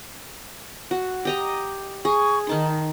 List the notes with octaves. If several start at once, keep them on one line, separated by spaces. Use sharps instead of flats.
F#4
G4 D#5 A#5
G#4 C#6
D#3 D#4 A5 C6